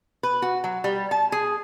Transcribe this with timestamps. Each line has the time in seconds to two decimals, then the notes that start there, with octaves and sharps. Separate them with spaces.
0.23 B4
0.42 F#4
0.64 F#3
0.84 G3
1.11 A5
1.32 G#4